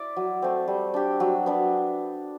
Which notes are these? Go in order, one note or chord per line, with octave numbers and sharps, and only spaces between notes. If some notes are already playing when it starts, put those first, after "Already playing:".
Already playing: E4 D5
F#3
A3 C4
G3
D4 G4
F#3
B3 D4